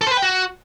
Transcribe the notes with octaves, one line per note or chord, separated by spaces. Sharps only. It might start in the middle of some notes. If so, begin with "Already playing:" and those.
A4
C5
B4
G5
F#4